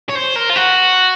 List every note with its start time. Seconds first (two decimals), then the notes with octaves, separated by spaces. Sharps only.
0.09 C#5
0.15 C5
0.36 A#4
0.49 F4
0.56 F#4